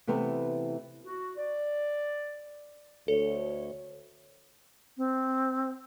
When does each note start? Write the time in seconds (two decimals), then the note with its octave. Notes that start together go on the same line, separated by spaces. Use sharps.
0.07 C3 E3 A3 B3 C4
1.05 F#4
1.37 D5
3.08 D2 A4 C#5
4.97 C4